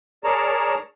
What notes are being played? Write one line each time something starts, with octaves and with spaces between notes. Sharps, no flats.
G#4 A#4 C#5 D5 A5 A#5